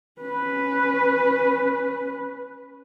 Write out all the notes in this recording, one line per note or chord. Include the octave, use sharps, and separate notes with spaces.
C#4 B4